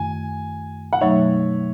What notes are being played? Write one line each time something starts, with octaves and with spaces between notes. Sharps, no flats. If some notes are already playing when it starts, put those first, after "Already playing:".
Already playing: F#2 D#3 A3 E4 G#5
F#5
B2 F#3 A3 D#4 C#5 E5